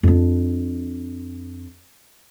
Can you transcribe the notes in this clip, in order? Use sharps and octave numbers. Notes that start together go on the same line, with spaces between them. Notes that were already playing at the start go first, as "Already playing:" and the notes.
F2 D4